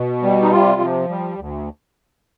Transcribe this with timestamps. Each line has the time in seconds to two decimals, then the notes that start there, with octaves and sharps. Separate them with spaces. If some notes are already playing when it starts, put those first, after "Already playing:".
Already playing: B2
0.23 G3
0.42 D#4
0.51 C3 F4
0.81 F3
1.10 G3
1.39 D2